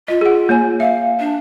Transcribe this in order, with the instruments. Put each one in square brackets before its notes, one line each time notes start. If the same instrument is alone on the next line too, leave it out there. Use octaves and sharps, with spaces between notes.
[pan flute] F4 [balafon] D#5
[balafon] G#4 F#5
A#3 C#5 G#5
[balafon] E5 [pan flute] F5
[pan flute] D4